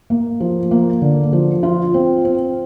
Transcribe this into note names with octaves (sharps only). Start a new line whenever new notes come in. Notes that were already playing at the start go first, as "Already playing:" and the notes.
A#3
F3
A#3
D3
F3
F4
C4
C4